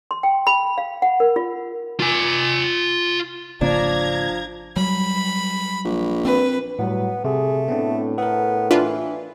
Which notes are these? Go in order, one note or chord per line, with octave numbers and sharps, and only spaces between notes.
C6
G5
B5
F5
F#5
A#4
F4
F4 G#5
G#1 C#3 F3 A#3 D4 A#5 G#6
F#3 G3 B5
A#1
C4 B4
A2 F#3 G3 B3
C3 A3 G#4
A2 B3 C4 D4
B3 A4 A#4
E3 D4 F4 B4